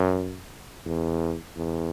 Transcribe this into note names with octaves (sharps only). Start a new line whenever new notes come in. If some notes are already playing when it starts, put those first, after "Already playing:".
Already playing: F#2
E2
E2